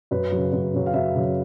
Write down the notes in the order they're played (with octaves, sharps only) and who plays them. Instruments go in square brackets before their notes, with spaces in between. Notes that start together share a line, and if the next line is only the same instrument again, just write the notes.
[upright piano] F#2 B4
F#3
C#3
F#2
C#3 F#3
F5
F#2 E5
C#3 F#3